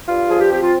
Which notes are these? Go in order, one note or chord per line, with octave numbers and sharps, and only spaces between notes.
G2 F4
F3 G#4
G4
C4 G4
F4